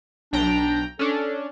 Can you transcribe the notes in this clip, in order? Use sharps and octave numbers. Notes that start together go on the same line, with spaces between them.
B1 D4 G5 A#5
C#4 D4 A4